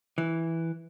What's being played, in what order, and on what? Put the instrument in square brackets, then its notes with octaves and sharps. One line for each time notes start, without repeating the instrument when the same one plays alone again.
[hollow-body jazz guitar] E3